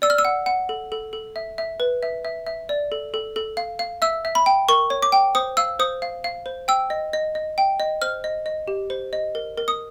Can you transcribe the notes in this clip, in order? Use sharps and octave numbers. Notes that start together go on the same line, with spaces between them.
D5 E6
F6
E6
F#5
F#5
A4
A4
A4
E5
E5
B4
E5
E5
E5
D5
A4
A4
A4
F5
F5
E5 E6
E5
B5
G5
A#4 C#6
C#5
D6
G5
C5 D#6
F5 E6
C5 D#6
F5
F5
C5
G5 E6
D#5
D#5
D#5
G5
D#5
C5 F6
D#5
D#5
G4
C5
D#5
A#4
A#4
D#6